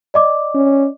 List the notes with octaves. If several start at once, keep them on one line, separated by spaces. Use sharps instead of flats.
D5 D#5 D6
C#4